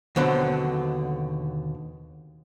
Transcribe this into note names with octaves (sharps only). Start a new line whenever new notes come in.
D#2 B2 D3 F#3 C4